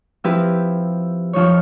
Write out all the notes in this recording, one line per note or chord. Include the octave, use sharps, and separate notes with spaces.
F3 C4 E4 G4 B4
F2 F3 D#4 C#5